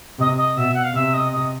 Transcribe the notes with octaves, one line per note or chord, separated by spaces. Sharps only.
C3 D#5
D#5
B2 E5
F#5
F5
C3 E5
D#5
D#5